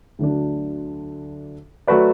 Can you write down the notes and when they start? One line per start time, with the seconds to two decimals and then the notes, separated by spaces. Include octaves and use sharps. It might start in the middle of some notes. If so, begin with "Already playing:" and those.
0.19 D2 D3 F#3 D4
1.87 F#3 A3 F#4 B4 D5